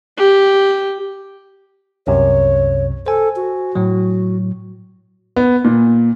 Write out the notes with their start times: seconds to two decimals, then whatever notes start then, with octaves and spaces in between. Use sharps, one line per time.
0.17 G4
2.07 C2 F#2 C3 C#5
3.06 A4 C5 G#5
3.36 F#4
3.75 A2 F#3
5.36 B3
5.64 A#2